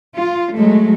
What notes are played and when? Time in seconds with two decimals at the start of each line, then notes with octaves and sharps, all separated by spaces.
0.17 F4
0.56 F#3 G#3 A3